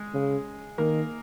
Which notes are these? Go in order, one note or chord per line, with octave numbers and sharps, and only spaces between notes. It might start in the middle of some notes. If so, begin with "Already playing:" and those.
Already playing: G#3
C#3
D#3 A#3